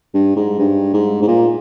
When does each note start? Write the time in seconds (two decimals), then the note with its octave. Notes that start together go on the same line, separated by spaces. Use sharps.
0.14 G2
0.36 G#2
0.59 G2
0.94 G#2
1.22 G#2
1.27 A#2